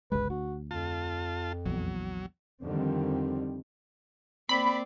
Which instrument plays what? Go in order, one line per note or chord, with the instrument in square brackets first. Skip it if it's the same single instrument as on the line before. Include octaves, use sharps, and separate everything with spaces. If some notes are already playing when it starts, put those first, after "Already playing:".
[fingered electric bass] G1 C#2 G#3 [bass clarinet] B4
[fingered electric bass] D2 [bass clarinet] F#4
[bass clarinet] F2 [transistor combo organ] F4 A5
[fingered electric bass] A#1 E2 [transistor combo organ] F#3
[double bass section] F2 D3 D#3 G3 C4
[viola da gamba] A#3 C4 D5 [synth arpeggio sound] B5